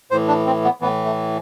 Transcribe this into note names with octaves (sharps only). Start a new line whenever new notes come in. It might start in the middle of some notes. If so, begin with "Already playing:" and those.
A2 E3 C5
D4
C4
B3
A2 E3 B3
A3